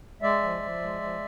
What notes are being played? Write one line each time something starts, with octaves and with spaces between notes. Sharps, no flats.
G#3 D5 E5
F3
F3
G#3
F3